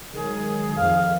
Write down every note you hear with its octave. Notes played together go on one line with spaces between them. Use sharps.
D#3 F#3 G#3 G#4
F2 D#3 F3 F5